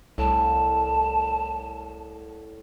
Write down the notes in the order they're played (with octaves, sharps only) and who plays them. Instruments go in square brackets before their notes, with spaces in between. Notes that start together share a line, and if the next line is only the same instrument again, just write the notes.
[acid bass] C2 [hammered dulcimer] A2 [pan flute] A5